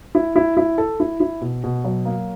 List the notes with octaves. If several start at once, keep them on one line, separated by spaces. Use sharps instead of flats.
E4
E4
E4
A4
E4
E4
B2
B2
F#3
A#3